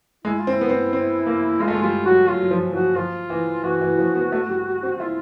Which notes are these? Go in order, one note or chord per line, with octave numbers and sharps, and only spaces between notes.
G#3 E4
F4
C4
E4
B3
C4
C4
A#3
G#3 F4
A3
G#3
G3 F4
F#3 F#4
F#3 F4
F#3
F3
F3 F#4
F3 F4
E3
E3 F#4
E3
F3
B3
A3
G3
C4
E4 F4